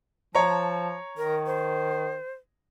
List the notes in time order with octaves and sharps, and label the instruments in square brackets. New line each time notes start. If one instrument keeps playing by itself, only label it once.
[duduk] F3 [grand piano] C#5 A#5 [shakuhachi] A5
[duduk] D#3 [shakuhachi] A#4
[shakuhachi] C5